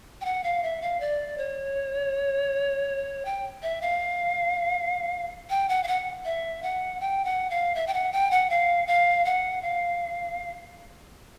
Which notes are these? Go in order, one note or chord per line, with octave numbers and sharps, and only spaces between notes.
G5
F#5
F5
E5
F5
D5
C#5
G5
E5
F5
G5
F#5
F5
F#5
E5
F#5
G5
F#5
F5
E5
G5
F#5
G5
F#5
F5
F5
F#5
F5